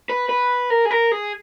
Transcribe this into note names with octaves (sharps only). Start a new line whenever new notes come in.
B4
B4
A#4
G#4
A#4
G#4